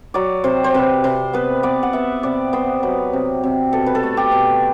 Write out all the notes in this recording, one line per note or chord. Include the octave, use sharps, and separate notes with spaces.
F#3 D5
C3 C5
C5
C3 B4
C3 C5
B3 B4
B3 D5
F#5
B3 E5
C3 D5
B3 C5
F#3 B4
C3
C3
B2 A4
B4
A4
A3
G4
B2